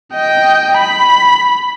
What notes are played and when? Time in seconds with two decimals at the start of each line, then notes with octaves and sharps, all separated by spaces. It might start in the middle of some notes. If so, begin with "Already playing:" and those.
0.13 D#5 G5
0.78 B5